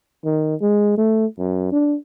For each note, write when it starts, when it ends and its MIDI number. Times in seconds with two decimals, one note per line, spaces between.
0.25 0.55 51
0.61 0.96 56
0.97 1.26 57
1.39 1.69 42
1.72 1.97 62